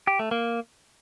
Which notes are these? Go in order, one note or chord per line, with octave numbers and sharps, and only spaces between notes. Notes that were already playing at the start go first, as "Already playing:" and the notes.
G4
A3
A#3